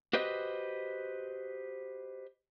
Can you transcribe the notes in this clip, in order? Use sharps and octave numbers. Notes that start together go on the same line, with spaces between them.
F#4 G4 B4 C5 D#5